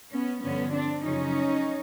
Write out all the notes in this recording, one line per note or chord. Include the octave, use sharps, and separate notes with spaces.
B3 C#4
G2 D3 F3 B3 C#4
C4 D4
F#2 C#3 F3 C#4 D#4